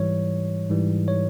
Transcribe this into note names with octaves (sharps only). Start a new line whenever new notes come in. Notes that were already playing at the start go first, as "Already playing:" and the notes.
Already playing: G#2 E3 G3 C#5
G#2 E3 G3
C#5